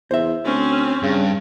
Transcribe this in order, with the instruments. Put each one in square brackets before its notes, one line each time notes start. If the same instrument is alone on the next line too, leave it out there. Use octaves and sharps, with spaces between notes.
[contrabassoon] E2 [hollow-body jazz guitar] C5 E5
[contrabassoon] D2 [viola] C4 C#4
[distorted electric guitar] G2 [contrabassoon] C#3